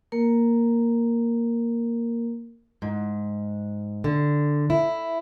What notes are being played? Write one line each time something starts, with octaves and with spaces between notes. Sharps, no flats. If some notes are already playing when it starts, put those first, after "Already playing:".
A#3 A#4
G#2
D3
E4